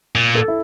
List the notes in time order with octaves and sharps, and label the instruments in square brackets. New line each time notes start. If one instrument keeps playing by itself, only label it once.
[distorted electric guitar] A#2
[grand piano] A4
E4